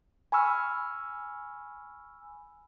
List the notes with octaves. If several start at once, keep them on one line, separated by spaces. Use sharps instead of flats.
G#5 B5 C#6 E6 F6